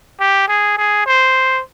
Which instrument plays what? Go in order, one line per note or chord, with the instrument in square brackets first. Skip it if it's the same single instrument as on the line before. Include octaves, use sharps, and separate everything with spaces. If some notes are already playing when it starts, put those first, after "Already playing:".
[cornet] G4
G#4
G#4
C5